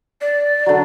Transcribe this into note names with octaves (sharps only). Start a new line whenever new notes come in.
D5
D3 F#3